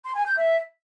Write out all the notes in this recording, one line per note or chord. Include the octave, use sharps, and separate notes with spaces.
C6
G#5
G6
E5